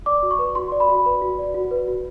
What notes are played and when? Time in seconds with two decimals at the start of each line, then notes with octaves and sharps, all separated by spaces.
0.06 D5 D6
0.23 F#4
0.31 C#6
0.39 B4
0.55 F#4 C6
0.72 D5
0.80 B5
0.89 F#4
1.06 B4
1.22 F#4
1.39 D5
1.54 F#4
1.71 B4
1.88 F#4